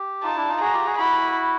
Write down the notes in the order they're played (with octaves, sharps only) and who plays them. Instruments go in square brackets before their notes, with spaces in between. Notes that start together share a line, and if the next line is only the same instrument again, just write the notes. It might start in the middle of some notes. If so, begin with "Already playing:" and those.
Already playing: [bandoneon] G4
[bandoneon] D#4 F4 [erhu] A5
[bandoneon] D4 E4
D#4 F4
[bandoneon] F#4 G#4 [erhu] A#5
[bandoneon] F4 G4
F#4 G#4
[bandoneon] E4 F#4 [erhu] B5